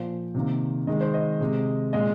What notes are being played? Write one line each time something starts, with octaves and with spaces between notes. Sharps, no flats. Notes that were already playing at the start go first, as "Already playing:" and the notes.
Already playing: A#2 F3 A#3 C5
C3 D#3 A#3
D#3 G#3 D#5
C5
D#5
C3 G#3
A#2 G#3 D#5